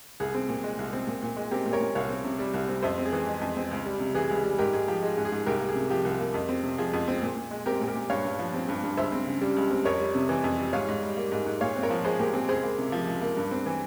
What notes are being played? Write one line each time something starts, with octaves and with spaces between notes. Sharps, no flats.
C2 G#4
C4
A#2
G#3
C2
C4
A#2
A#2
G#3
C4 G4 A#4
A#2
A#4 C#5
A#2
C2 C#5 F5
C4
C3
G3
C2
C4
F2 C5 E5
C4
G#4
E3
G#3
F2
C4
C#2
G3
C3
E3 G#4
C#2
G#4
G3
G#2 G4 A#4
G#2 G#4
F3 G4
G#3 G#4
G#2
G#4
G#2
C2 G4 A#4
A#3
G#4
C3
F3 G4
C2
A#3
F2
C4
C3
F3 G#4
F2
C4
A#2
A#2
G#3
C4 G4 A#4
A#2
G4 A#4
A#2
G2 C#5 F5
G2
F3
C4
G2
G2
C#2 C5 E5
C4
C#3
G3
C#2
C4
F2 A#4 C#5
G3
C3
E3
F2
G3
G#2 C#5 F5
G#2
G3
A#3
G#2
G#2
A#2 C#5 F5
C4
A#4 C#5
F3
G#3 G#4 C5
A#2 G4 A#4
C4 G#4
C#2 G#4 C5
A#3
C3
F3
C#2
A#3
G2
C4
E3